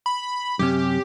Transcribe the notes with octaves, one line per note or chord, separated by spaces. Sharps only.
B5
F#2 C3 C#4 G4